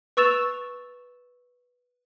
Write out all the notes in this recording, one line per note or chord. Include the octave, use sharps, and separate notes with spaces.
B4 C#6 E6 A6 E7 F7